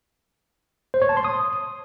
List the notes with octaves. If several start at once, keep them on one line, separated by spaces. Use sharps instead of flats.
C5
C#5
A5
C6
D#6